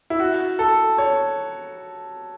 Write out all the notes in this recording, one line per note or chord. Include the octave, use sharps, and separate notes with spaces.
E4
F#4
A4
C#5